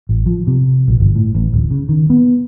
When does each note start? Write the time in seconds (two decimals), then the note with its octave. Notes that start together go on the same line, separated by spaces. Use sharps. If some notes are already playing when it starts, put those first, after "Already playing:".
0.09 A1
0.26 F3
0.47 C3
0.88 A#1
1.00 G1
1.15 A2
1.35 A1
1.53 D1
1.71 C#3
1.89 D#3
2.10 B3